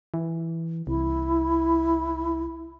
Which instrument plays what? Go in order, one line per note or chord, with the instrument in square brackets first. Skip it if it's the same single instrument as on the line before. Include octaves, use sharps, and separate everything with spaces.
[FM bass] E3
[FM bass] C2 [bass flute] E4